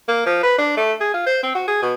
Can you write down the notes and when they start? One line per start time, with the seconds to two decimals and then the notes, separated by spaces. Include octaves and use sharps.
0.08 A#3
0.26 F3
0.43 B4
0.58 D4
0.77 A3
1.00 G#4
1.14 F4
1.26 C5
1.43 C4
1.55 F#4
1.68 G#4
1.82 B2